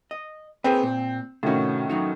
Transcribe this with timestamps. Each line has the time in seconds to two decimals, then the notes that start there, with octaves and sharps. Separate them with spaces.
0.11 D#5
0.64 A#3 C4 G#4 B4
0.83 A#2
1.43 A2 C3 D#3 C#4 F#4
1.90 F#3 D#4 F#4